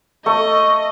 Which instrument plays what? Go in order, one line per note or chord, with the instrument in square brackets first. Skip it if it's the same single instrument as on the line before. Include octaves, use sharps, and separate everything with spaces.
[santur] A3 C#6 [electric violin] D#5